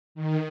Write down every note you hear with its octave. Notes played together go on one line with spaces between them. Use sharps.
D#3